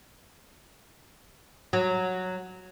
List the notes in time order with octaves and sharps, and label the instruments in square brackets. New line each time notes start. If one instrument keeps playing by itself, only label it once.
[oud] F#3